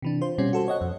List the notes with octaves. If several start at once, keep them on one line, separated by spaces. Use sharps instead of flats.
C3 E3 D4
F4 C5
B2 G3 C4 C#4
F#4 A4 C5
C5 C#5 D#5 F#5
F2